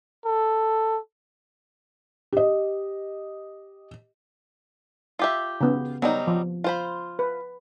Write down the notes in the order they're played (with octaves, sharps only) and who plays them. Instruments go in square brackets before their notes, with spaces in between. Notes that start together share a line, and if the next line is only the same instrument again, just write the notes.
[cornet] A4
[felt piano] G4 D#5
[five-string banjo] F4 G4 E5
[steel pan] C#3 B3
[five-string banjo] F#3 G3 D#4 [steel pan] B3
[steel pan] F3
[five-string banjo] F4 C5 B5
[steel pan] B4